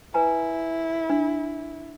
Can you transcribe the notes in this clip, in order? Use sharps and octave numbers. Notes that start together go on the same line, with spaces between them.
E4 B4 G#5 A#5
D4